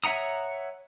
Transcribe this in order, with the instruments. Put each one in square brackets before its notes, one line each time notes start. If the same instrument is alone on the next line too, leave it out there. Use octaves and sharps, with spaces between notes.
[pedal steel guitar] C#5 E5 F#5 A#5 D#6